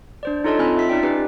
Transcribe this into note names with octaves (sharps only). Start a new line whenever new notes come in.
D4 C5 D5
D#4 F4 A4 C#5 D#5 A5
C4 F4 G#5 B5 F6
E5 B6
C#4 D#4 D5 G5
C#4 D#4 G4 B4